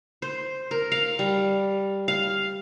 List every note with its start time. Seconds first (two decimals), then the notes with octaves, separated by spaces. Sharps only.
0.22 C5
0.71 A#4
0.92 F5
1.19 G3
2.08 F5